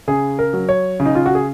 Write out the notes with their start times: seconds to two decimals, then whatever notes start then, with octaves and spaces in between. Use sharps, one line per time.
0.08 C#3 G#4
0.39 A#4
0.53 F#3
0.69 C#5
1.00 C#3
1.06 D#4
1.15 F4
1.26 F#4
1.35 G#4